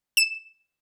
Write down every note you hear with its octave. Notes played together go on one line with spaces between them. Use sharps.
E7